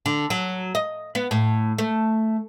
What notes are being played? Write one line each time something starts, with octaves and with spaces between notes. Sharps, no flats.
D3
F#3
D#5
B3
A2
A3